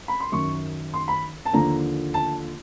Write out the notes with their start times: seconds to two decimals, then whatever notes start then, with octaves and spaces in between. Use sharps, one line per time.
0.08 B5
0.20 C6
0.32 F#2 D#3 C#6
0.94 C6
1.08 B5
1.45 A5
1.53 D#2 D3 F3 A#5
2.14 A5